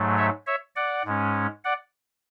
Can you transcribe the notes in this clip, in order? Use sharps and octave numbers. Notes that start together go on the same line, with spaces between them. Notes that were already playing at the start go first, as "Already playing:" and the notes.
Already playing: G#2 F#3 A3
C#5 E5
C#5 E5
D5 F#5
G#2 G#3 C#4
D5 F#5